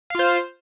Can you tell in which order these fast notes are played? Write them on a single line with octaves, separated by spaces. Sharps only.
F5 F4 C5